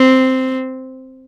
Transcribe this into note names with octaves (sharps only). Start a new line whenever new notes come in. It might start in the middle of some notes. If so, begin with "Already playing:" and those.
Already playing: C4